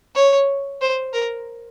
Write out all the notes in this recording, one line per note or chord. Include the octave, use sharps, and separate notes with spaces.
C#5
C5
A#4